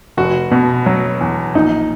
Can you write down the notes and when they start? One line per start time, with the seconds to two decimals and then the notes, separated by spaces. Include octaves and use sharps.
0.17 F1 F#4
0.51 B2
0.86 F#3
1.21 E2
1.55 A#1 D#4